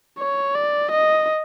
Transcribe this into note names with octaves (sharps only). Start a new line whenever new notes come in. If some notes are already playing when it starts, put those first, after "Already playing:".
C#5
D5
D#5